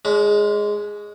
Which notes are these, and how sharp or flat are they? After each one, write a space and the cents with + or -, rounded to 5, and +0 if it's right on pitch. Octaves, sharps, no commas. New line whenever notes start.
G#3 +0 C#4 +45